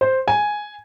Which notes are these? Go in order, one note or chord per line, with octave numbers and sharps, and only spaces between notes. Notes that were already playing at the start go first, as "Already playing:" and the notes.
C5
G#5